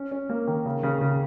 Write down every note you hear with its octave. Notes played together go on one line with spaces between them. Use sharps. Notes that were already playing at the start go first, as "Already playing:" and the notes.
Already playing: C#4
C#4
A#3
D#3
C#3
C#3
C#3